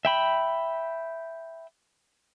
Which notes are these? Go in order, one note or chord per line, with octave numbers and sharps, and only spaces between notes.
E5 G5 B5